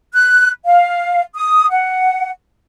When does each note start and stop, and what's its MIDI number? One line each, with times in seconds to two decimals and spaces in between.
0.13 0.49 90
0.65 1.22 77
1.34 1.67 87
1.71 2.29 78